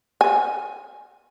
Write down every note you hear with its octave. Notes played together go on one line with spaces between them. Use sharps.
G#5